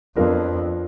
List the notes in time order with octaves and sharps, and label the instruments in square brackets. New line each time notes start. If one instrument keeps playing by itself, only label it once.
[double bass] F2 [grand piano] F3 B3 D4 F4 A#4